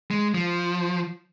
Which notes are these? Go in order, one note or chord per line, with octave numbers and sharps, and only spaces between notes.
G#3
F3